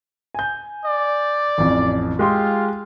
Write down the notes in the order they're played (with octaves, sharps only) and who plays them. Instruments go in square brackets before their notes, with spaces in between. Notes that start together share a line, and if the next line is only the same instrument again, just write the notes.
[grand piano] G#5 G6
[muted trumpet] D5
[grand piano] A1 F2
[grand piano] G#3 G4 C6 [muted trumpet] F4